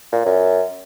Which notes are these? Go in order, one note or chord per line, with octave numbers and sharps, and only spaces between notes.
A#2
F#2